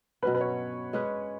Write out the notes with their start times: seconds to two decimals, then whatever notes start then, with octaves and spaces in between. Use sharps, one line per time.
0.22 B2 F#3 C#4 B4
0.35 B4
0.41 C#5
0.93 G#3 C#4 G#4 B4